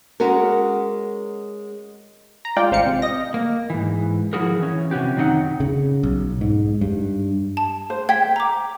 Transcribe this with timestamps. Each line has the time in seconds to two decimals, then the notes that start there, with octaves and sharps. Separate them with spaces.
0.20 G#3 C#4 F#4 A#4
2.45 A#5
2.57 G#3 F4 D5 G5
2.71 A1 C5 F5 C#7
2.86 C3
3.02 D#5 A#6
3.34 A#3
3.70 G#2 E3
4.33 F3 G#3 E4 F#4 G#4 A#4
4.59 E3 C#4
4.91 C3 C#4 F#4 G4
5.16 F#2 C3 D#3 F#3 D#4 F#5
5.60 C#3
6.03 B1
6.41 G#2
6.81 G2
7.57 A5
7.90 C5
8.09 G5 G#6 B6
8.36 A#5 D6